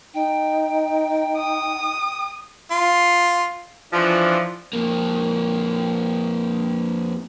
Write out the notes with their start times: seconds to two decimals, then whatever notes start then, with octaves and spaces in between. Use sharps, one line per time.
0.14 D#4 G5
1.37 D#6
2.71 F4
3.92 E3 F3 D4
4.73 F2 A#3